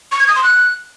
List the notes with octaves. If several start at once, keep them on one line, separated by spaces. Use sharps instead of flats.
C#6
G#6
D#6
C6
F#6